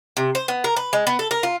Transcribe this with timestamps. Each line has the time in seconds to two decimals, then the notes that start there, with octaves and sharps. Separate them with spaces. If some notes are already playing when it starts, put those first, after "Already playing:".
0.17 C3
0.35 C5
0.48 B3
0.64 A#4
0.76 B4
0.93 G#3
1.07 B3
1.19 A4
1.31 A#4
1.43 F4